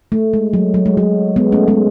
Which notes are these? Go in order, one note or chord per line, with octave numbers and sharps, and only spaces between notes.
A3
G#3
F#3
F#3
G#3
F#3
G#3 B3
A3 C#4
G#3 B3